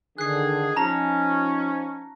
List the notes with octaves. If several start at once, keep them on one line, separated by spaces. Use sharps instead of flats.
D3 D#3 G#4 F#6 C7
F3 C#4 D#4 A5 A#5 A#6